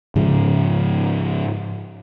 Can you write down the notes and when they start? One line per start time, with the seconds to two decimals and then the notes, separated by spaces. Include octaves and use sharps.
0.16 G#2 C#3 F3